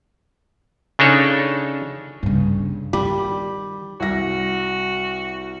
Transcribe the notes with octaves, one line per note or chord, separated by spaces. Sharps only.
C#3 D4 D#4 A4 C#5
G2 C#3
D#3 G3
C2 F#4 A#6